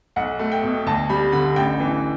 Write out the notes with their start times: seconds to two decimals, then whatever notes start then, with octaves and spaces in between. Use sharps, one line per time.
0.16 B1 F#5
0.39 A3
0.52 G5
0.63 B2
0.87 D2 A5
1.09 G3 B5
1.32 D3 B5
1.56 A1 G5
1.80 E3